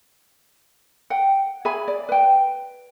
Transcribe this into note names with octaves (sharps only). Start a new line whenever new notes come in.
F#5 G5
G#4 E5 G#5 B5
D5
B4 G5